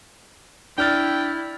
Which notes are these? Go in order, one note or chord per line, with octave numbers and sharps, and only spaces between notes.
D4 E4 G5 F6 A6